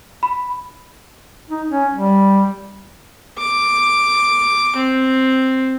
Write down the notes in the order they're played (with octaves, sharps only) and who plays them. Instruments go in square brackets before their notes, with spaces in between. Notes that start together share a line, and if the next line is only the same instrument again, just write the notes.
[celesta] B5
[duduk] D#4
C#4
G3
[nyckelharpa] D6
C4